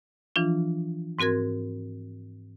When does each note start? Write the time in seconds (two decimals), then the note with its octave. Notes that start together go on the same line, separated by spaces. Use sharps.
0.36 E3 F3 D4 F4
1.19 G#2 C4 F#4 A#4 G#6